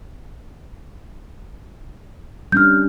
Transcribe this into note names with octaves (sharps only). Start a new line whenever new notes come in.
G3 C#4 D4 F6 G6